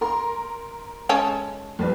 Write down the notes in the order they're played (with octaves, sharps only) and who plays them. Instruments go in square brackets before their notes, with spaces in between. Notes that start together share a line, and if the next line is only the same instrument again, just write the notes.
[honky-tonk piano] A#4 A#5 C6
[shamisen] G#3 C#4 A4
[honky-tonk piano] A#1 G3 B4